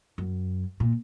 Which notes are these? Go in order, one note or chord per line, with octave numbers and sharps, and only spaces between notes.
F#2
A#2